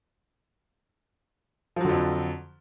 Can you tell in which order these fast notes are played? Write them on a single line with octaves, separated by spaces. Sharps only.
F3 F#3 D3 F2